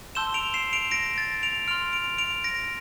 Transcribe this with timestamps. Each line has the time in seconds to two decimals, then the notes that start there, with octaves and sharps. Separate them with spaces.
0.15 A5 C6 E6 G6 E7 G7
0.34 D7 F7
0.54 C7 E7
0.73 D7 F7
0.91 A#6 D7
1.18 A6
1.43 D7 F7
1.68 C6 F6 D7 F7
1.93 D7 F7
2.18 D7 F7
2.44 A#6 D7